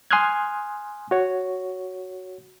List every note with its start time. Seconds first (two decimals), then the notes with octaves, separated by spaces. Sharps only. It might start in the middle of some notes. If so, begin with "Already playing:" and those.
0.11 G#5 C6 D#6 F6 F#6 G#6
1.11 F#4 C#5